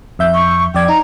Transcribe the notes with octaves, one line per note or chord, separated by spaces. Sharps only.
F2 E5 G6
C#6
F2 D5 G5 G#6
D#4 A#5